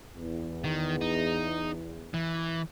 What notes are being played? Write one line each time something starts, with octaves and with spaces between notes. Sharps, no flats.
E2
D#3
D#4
E3